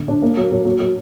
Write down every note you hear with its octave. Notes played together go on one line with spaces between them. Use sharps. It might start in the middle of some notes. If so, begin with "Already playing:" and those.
Already playing: D3
D4
A#3
F#3
F#3
F#3
F#3